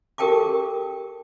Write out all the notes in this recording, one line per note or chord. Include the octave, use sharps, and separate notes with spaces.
G4 A4 A#4 G5 A5 D6